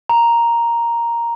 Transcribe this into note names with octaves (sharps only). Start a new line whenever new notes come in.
A#5